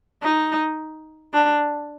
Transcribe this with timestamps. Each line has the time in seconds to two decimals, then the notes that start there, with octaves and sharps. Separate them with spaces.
0.22 D#4
1.33 D4